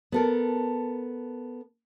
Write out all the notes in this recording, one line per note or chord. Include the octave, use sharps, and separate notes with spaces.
B3 A4 A#4